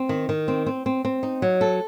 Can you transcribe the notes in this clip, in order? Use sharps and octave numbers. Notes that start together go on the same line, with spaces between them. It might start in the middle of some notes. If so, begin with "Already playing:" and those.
Already playing: C4
D#3
D#3
C4
C4
C4
C4
D#4
F#3
A4